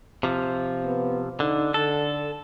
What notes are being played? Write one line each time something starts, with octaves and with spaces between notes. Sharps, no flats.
C3 F3
B3
D3 D#4
D3 A4